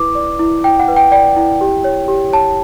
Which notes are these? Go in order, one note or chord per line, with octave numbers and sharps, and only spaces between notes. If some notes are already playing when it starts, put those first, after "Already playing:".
Already playing: E4 B4 D6
D5
E4
E4 G5
F#5
B4
G5
D5 G5
E4
G4
C#5
G4
C#5 A5